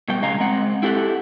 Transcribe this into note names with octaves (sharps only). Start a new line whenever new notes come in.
B2 G3 G5
C#3 G#3 D#5 F5 G#5 A#5
G#3 C4 F#5
E4 G4 A4 F#5